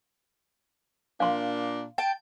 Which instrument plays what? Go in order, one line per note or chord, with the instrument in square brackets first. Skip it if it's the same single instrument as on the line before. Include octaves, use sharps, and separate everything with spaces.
[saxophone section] A#2 A#3 D4 [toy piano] F5 C6
[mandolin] G5 A5